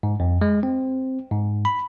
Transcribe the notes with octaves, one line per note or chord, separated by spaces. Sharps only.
G#2
F2
G#3
C4
G#2
B5